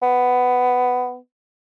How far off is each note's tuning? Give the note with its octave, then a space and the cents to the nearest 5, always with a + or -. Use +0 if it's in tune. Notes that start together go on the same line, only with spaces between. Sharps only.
B3 +10